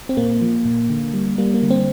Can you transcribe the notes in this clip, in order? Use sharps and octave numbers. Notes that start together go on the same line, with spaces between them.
C4
A#2 A#3
F3
A#2
D3
G3
G3 A#3
A#3
D3
C4